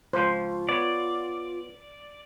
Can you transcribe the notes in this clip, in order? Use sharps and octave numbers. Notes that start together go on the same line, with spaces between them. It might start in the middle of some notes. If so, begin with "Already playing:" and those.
C#2 F3 F4 C5
B3 C#5 D5